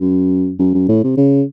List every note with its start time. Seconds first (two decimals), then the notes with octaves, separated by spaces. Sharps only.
0.01 F#2
0.59 F#2
0.74 F#2
0.88 A2
1.03 C3
1.17 C#3